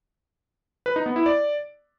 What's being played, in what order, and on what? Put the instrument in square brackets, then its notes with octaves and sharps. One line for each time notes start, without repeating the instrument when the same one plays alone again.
[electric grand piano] B4
D#4
B3
E4
D5